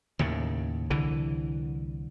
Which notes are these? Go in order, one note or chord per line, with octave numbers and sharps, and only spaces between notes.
D#2 A2 C#3
C2 D3 E3